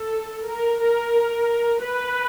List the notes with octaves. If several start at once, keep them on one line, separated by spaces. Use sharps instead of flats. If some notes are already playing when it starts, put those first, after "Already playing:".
Already playing: A4
A#4
A#4
B4